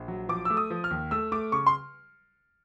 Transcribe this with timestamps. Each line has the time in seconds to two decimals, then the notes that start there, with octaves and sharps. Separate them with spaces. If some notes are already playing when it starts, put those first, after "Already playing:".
Already playing: A#1
0.08 F#3
0.29 F3 D6
0.45 A3 E6
0.57 D#6
0.70 F3
0.84 F6
0.91 D#2
1.11 A3 E6
1.32 A3 D6
1.52 C#3 C#6
1.66 C6